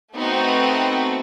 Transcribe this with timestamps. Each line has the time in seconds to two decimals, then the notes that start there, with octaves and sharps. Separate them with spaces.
0.15 A3 B3 C4 D#4 F#4